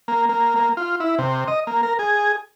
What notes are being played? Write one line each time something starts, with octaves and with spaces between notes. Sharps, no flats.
A#3
A#3
A#3
F4
E4
C3
D#5
A#3
A#4
G#4